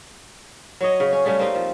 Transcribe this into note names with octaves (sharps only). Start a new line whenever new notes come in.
F#3 C#5 D#5
C#3
C#4
C#3 G3 A3 G#4
A#3 C4 D#4 G4
F3